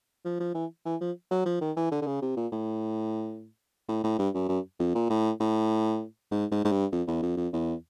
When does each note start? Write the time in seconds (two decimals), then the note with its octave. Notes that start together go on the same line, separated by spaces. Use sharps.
0.25 F3
0.40 F3
0.55 E3
0.85 E3
1.01 F3
1.31 F#3
1.46 F3
1.61 D#3
1.77 E3
1.92 D3
2.02 D3
2.07 C#3
2.22 C3
2.37 A#2
2.52 A2
3.88 A2
4.04 A2
4.19 G2
4.34 F#2
4.49 F#2
4.80 F2
4.95 A#2
5.10 A2
5.40 A2
6.31 G#2
6.52 G#2
6.65 G#2
6.72 G2
6.92 F2
7.07 E2
7.22 F2
7.37 F2
7.53 E2